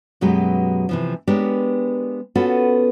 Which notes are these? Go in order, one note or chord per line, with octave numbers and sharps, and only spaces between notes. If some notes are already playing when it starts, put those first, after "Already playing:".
F#2 B2 F#3 G#3 G4 B4
C3 E3 F3
G#3 B3 D4 G4 A#4 C#5
B3 C#4 F4 F#4 A4 B4